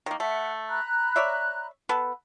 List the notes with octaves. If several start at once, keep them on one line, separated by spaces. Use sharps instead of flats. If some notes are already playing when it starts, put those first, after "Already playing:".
D#3 A#3 D#4
A3 E5 F#5
A#5 B5 F#6
C#5 D5 E5
B3 A4 B4